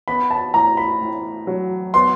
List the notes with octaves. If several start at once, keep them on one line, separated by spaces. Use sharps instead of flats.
B3 B5
A5
A2 A#5
B5
A2
F#3
B3 C6